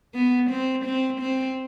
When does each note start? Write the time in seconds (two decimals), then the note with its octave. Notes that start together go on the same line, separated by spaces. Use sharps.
0.14 B3
0.50 C4
0.85 C4
1.21 C4